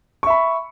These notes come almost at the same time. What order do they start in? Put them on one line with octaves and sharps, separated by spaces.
C#6 E5 B5